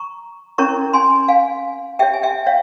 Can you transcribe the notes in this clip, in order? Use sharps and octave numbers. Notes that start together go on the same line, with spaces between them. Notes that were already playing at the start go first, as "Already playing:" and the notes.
Already playing: A#5 C#6
C#4 E4 A#4 C#5 A#5 C#6
G#5 C6
F5 G#5
G4 C#5 E5 G5
G#5
E5 G5
C#5 F5